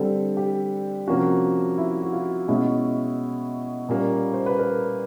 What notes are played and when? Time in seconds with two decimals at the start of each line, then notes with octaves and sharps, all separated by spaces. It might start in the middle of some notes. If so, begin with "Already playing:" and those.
Already playing: D3 G3 C4 A4
0.37 G4
1.07 C3 F3 A#3 C#4 F#4
1.78 E4
2.03 F#4
2.13 F4
2.48 B2 G#3 C#4 E4
3.89 A#2 G3 A#3 C#4
4.34 C5
4.46 B4
4.59 A#4